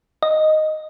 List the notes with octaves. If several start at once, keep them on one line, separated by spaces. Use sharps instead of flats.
D#5